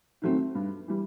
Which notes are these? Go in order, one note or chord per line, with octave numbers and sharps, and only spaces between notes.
D#3 F#3 A3 C4
G2
E3 G3